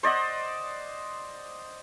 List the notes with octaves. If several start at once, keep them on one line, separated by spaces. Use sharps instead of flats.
C5 D5 D#5 F#5